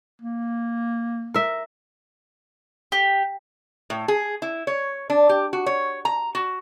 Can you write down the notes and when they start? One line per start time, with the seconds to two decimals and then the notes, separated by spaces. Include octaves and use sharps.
0.22 A#3
1.34 A#4 E5
2.92 G4
3.90 A2
4.08 G#4
4.42 E4
4.67 C#5
5.10 D4
5.29 G4
5.53 F#4
5.66 C#5
6.05 A#5
6.35 F#4